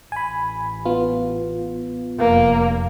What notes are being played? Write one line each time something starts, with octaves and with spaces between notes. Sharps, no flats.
A1 G#5 B5
B3 F4
F1 A#3